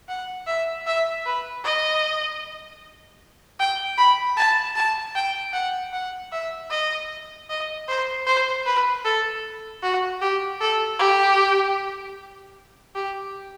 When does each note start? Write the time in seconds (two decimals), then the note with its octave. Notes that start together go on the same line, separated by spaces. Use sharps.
0.09 F#5
0.47 E5
0.87 E5
1.26 B4
1.64 D#5
3.60 G5
3.98 B5
4.37 A5
4.76 A5
5.15 G5
5.53 F#5
5.93 F#5
6.32 E5
6.70 D#5
7.50 D#5
7.88 C5
8.26 C5
8.66 B4
9.05 A4
9.83 F#4
10.21 G4
10.61 A4
10.99 G4
12.95 G4